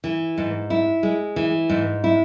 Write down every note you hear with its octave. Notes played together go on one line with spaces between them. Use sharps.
E3
G#2
E4
G#3
E3
G#2
E4